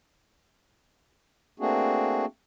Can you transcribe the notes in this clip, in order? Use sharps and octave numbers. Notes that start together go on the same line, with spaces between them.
A3 A#3 C4 D4 F#4 G#4